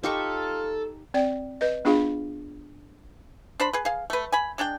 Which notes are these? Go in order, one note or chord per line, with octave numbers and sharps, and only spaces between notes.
D#4 F4 G4 A4 A5 C#6
C4 D5 G5
B4 D#5
B3 D4 F4 G#4 F5 B5
D4 C5 B5
G#4 B4
G#4 F5
A3 B4
G#5 B5
G#3 D4 D5 G5